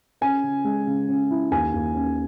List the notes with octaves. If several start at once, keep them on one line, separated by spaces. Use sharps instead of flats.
C#4 G#5
C#3
G#3
C#3
C#4
E4
D#2 G#5
D#2
C#4